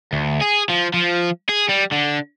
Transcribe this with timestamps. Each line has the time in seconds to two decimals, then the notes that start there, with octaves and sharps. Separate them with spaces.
0.13 D2
0.41 G#4
0.69 F3
0.94 F3
1.49 G#4
1.69 G3
1.92 D3